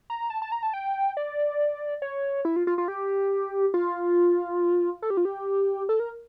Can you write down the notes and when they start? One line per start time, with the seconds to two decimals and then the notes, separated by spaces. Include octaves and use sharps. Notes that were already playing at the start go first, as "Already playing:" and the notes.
0.10 A#5
0.30 A5
0.42 A5
0.52 A#5
0.63 A5
0.73 G5
1.17 D5
2.02 C#5
2.45 E4
2.56 F4
2.67 F4
2.78 F4
2.88 G4
3.74 F4
5.02 A4
5.10 G4
5.17 F4
5.25 G4
5.89 A4
6.00 A#4